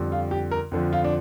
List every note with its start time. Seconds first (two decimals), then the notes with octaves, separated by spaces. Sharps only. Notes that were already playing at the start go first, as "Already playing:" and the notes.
Already playing: F2 D3 G3
0.12 F4
0.31 G4
0.51 A#4
0.72 F2 D3 F3
0.93 F4
1.04 D4